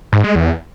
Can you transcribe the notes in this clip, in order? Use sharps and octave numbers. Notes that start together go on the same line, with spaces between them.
G#2
G#3
E2